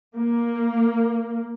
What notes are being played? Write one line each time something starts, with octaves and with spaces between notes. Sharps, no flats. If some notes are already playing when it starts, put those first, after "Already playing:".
A#3